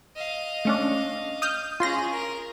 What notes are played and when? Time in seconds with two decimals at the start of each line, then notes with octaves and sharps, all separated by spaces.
0.15 D#5 F5
0.65 A3 C#4 D4
1.42 D#6 F6 G6
1.80 C#4 F4 G#4 C6 A#6
2.12 A#4